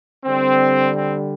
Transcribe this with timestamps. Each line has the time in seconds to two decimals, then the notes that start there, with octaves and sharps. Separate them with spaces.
0.24 D3 G3 C4
0.94 C4